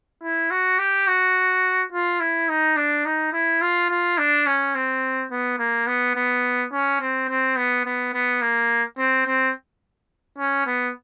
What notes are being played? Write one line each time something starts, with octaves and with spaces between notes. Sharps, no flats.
E4
F#4
G4
F#4
F4
E4
D#4
D4
D#4
E4
F4
F4
D4
C#4
C4
B3
A#3
B3
B3
C#4
C4
C4
B3
B3
B3
A#3
C4
C4
C#4
B3